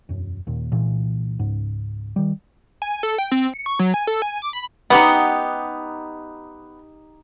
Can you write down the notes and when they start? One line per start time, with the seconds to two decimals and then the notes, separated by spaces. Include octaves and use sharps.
0.09 E1 F#2
0.47 D#2 A#2
0.71 C2 A#2 E3
1.39 C#2 G#2
2.16 D#3 G3
2.82 G#5
3.03 A4
3.18 G5
3.32 C4
3.54 C#7
3.66 C#6
3.79 F#3
3.94 G#5
4.07 A4
4.22 G#5
4.42 D6
4.53 B5
4.90 B3 D#4 G4 F#5